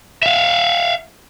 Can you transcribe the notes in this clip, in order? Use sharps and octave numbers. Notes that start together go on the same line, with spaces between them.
E5 F5